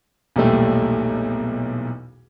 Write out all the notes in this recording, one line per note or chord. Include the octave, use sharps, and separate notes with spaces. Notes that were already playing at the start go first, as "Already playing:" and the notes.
B1 E2 A#2 G3 A3